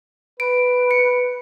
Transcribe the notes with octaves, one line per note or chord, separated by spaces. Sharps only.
B4 D7
C#7